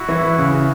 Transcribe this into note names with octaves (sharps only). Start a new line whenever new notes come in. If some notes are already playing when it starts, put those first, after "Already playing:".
Already playing: E4 F#4
E3
C#3